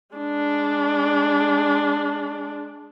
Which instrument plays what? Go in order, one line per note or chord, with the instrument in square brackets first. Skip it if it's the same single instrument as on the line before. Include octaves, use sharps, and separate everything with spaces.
[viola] G#3 D4